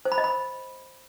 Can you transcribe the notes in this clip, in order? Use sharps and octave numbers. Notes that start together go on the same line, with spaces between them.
C5
B5
D#5
B5